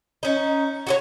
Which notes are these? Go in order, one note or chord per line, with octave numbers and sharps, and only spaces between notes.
C#4 D#4
F#4 G#4 C#5